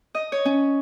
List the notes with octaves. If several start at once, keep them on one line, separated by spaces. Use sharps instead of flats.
D#5
C#5
C#4